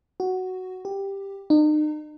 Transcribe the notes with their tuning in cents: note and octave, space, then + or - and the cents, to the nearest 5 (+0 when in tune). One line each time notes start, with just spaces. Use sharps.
F#4 +5
G4 +5
D#4 -40